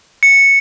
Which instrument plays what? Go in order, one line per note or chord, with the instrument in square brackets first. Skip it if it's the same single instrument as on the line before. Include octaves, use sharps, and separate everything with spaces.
[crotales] C#7